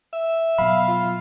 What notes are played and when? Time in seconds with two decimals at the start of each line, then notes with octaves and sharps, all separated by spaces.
0.13 E5
0.58 B2 F#3 F5 B5
0.88 F4